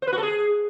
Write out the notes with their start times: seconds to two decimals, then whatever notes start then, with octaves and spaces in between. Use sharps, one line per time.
0.02 C5
0.07 B4
0.13 F#4
0.18 A4
0.23 G#4